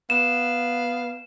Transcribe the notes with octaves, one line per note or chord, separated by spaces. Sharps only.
B3 F5 E7